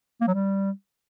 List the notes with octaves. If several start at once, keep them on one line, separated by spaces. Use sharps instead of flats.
A#3
F#3
G3